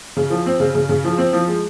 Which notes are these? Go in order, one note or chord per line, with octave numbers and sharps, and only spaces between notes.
C#3
F3
C4
C#3
C#3
C#3
F3
C4
F3
G#3